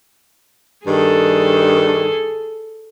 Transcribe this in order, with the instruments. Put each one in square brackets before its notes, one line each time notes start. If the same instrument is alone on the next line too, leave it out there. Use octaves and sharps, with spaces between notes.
[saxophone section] G2 D#3 D4 [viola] G#4 A4